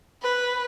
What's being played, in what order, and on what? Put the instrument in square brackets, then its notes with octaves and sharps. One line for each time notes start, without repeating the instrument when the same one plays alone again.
[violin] B4